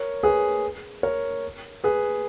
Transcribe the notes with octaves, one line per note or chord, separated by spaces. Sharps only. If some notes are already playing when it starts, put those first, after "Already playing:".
Already playing: A#4 C#5
G#4 B4
A#4 C#5
G#4 B4